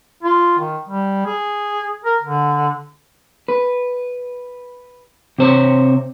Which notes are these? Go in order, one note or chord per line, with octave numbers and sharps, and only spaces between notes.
F4
D#3
G3
G#4
A#4
D3
B4
C3 C5 C#5